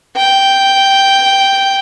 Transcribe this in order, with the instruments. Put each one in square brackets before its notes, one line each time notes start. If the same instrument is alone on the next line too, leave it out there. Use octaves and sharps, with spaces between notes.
[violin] G5